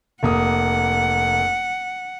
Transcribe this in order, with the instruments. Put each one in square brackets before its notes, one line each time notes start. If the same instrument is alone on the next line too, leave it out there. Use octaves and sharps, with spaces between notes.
[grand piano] F1 A#3 D#6 [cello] F#5